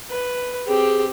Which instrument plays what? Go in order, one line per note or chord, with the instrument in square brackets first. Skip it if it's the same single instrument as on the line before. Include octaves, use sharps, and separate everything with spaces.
[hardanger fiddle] B4
[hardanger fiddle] C4 G4 [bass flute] G#4